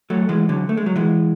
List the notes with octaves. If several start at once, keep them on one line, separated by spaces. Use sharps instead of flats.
F#3 A3
E3 G#3
D3 F#3
A3
G#3
F#3
E3 G#3